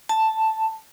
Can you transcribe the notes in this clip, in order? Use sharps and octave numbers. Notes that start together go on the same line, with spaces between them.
A5